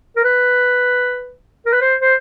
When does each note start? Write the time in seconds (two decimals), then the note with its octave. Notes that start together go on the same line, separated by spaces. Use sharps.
0.17 A#4
0.24 B4
1.66 A#4
1.73 B4
1.81 C5
2.01 C5